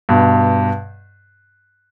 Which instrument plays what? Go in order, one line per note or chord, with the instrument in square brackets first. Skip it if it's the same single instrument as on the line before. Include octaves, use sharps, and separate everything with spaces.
[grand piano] G2 B2